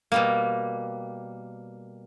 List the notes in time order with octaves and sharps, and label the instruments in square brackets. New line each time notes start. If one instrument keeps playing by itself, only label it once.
[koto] B2 G3 A#3